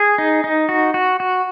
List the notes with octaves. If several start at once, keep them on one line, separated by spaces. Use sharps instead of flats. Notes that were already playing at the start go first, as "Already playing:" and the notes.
Already playing: G#4
D#4
D#4
F#4
F#4
F#4